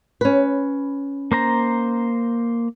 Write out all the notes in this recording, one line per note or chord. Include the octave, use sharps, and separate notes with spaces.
C#4 B4
A#3 C5 A#5